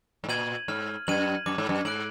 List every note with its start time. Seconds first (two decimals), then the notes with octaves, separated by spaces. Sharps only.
0.24 G#2
0.29 A#2 G#6 D#7 F#7
0.68 G#2 F6
1.07 F#2 G#6 D#7 F#7
1.46 F#2 D6
1.58 G#2
1.69 F#2
1.85 G#2 F#6 D7 F#7